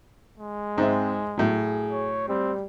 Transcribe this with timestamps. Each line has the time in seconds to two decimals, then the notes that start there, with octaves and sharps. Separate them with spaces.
0.38 G#3
0.78 G#2 C4 E5
1.38 A2 F#3 G#4
1.91 C#5
2.29 G3 C4